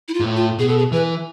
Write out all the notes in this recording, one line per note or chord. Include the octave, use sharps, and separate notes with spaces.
E4
F4
G#2
A2
F4
B2 G#4
A4
G#4
E3 B4